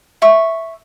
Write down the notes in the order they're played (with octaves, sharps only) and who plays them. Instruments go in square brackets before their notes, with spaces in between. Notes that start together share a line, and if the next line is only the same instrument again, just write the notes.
[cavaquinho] E5 C#6